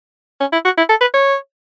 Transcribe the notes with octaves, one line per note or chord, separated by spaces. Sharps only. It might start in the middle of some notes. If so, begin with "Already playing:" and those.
C#4
E4
F#4
E4
A4
B4
C#5